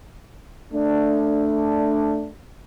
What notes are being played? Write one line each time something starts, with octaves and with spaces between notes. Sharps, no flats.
A3 D4